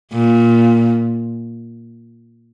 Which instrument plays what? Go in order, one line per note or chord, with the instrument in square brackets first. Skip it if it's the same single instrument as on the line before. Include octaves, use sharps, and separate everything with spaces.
[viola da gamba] A#2